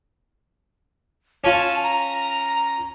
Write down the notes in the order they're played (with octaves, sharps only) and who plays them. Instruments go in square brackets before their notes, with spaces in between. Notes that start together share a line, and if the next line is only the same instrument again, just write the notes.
[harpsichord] C#4 F4 [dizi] A5
[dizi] A#5